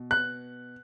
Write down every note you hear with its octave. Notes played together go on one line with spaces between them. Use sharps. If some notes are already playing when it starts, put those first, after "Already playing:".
Already playing: B2
F#6